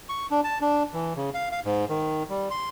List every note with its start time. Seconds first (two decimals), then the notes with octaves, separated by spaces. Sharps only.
0.09 C#6
0.31 D4
0.44 A5
0.61 D4
0.93 E3
1.16 C#3
1.34 F5
1.52 F5
1.65 G#2
1.89 D#3
2.29 G3
2.51 C6